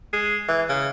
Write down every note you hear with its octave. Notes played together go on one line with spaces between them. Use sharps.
G#3
E3
C#3